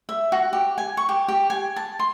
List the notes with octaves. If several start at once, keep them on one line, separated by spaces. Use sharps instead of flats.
E5
F#4
G4
G#5
C#6
G4
G4
G#5
A5
C6